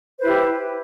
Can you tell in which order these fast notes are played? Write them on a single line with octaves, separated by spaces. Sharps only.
C5 B4 E4 G4